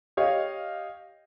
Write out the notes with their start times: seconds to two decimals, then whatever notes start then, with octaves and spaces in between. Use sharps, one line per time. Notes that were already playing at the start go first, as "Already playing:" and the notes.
0.17 G4 C#5 D#5 F5